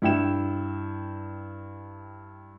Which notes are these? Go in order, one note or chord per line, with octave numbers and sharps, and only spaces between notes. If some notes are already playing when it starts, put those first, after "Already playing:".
G2 E4 G5 E7